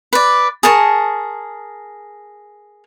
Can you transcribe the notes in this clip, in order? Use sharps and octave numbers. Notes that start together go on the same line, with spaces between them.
B4 D5
G#4 A#4 A5 C#6